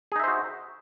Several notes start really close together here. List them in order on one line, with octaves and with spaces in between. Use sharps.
G#4 D#4 E5 C5 F#4